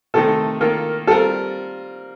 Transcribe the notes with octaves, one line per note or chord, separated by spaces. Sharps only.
C3 D#3 A3 D#4 A4
D#3 A#3 F4 A4 A#4
G3 C4 F4 A4 A#4